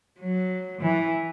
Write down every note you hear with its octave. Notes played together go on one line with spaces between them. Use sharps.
F#3
E3